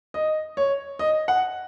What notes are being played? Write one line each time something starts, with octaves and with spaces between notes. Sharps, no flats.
D#5
C#5
D#5
F#5